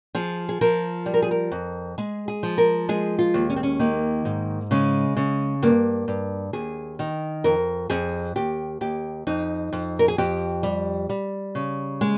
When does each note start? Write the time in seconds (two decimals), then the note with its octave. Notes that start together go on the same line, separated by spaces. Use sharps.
0.15 F3 G#4
0.49 G#4
0.61 F3 A#4
1.06 G3
1.14 A#4
1.22 G#4
1.31 A#4
1.52 F2
1.98 G#3 G#4
2.28 G#4
2.43 F3
2.58 A#4
2.89 G#3 G#4
3.19 F4
3.34 D#2
3.50 C#4
3.56 C4
3.63 C#4
3.79 D#3 A#3
4.25 G#2
4.71 C#3 G#3
5.17 C#3
5.63 G2 A#3
6.08 G2
6.53 D#2 G#4
6.99 D#3
7.44 F2 A#4
7.90 F2 G#4
8.36 D#2 G4
8.81 D#2 G4
9.27 F2 D#4
9.73 F2
9.99 A#4
10.08 G#4
10.18 F2 G4
10.63 G3
11.09 G3
11.55 C#3
12.01 G#3